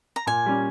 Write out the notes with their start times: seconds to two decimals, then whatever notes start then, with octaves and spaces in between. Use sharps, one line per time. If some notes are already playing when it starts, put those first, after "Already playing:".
0.16 A#5
0.27 A#2 G#5
0.46 G3 C#4